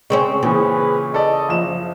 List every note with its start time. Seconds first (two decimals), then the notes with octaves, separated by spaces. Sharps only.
0.10 C#3 C4 C#4
0.43 A#2 C#3 E3 G#4 B4
1.14 A4 D5 D#5
1.49 F#1 F3 E7